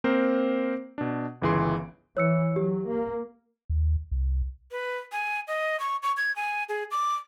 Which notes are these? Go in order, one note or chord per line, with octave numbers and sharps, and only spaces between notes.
A#3 C4 A#4 C5
B2 D4
G1 C#2 E3 G#4 C6 D7
E3 C#5 E6 C#7
F#3 G4
A#3
D#2
C2
B4
G#5
D#5
C#6
C#6
G#6
G#5
G#4
D6